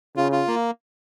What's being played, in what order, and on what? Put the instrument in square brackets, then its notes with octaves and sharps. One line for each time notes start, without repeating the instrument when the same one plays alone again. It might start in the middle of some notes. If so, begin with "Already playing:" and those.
[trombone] C#3 [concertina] F4
[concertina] F4
A#3